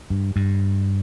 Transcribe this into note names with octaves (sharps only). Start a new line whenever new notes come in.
G2
G2